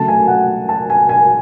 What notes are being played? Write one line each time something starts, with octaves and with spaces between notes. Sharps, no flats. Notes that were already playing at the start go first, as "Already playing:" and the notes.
Already playing: C#3 F#3 A3 A5
G#5
F#5
A5
G#5
G#5